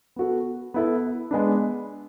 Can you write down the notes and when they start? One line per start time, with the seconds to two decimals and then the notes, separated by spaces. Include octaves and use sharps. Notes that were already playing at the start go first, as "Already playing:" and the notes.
0.16 B3 F#4 A4
0.74 B3 E4 A4
1.31 G#3 B3 D4